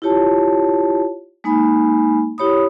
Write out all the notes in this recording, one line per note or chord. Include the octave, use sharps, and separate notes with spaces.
E4 F4 G4 C#5 A5
G#3 A#3 D#4 G#5 B5
E4 G4 C#5 B5 D#6